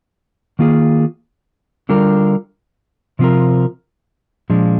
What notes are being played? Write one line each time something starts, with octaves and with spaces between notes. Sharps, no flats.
D#3 A#3 F4 G#4
D3 G3 D4 F4 A#4
C3 F3 C4 F4 A#4
A#2 F3 G#3 D4